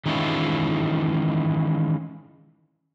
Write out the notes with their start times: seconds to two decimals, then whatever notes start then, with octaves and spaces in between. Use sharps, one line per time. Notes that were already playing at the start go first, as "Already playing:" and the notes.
0.06 D#3 E3 G#3 C#4 E4 F4